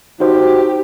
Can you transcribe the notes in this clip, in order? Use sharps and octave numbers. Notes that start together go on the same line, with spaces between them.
D#4 F#4 G4 C5